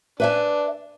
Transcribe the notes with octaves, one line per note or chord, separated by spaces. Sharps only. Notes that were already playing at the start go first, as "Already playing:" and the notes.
D4 B4 E5 G#5